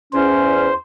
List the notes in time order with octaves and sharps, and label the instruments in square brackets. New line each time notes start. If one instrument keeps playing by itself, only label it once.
[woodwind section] E2 C#4 [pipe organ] C5